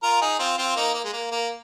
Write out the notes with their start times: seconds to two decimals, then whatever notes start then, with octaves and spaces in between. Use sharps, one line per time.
0.03 F4 A#4
0.21 D#4 G#4
0.39 C4 F4
0.58 C4 F4
0.76 A#3 D#4
0.94 A#3
1.04 G#3
1.13 A#3
1.32 A#3